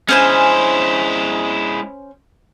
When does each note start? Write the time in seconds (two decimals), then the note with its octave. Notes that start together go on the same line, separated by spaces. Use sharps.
0.08 G#3 C#4 E4 C5 G#5